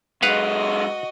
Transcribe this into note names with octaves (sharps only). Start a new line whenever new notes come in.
F#2 G#3 F#4 B4 D#5 F5 F#5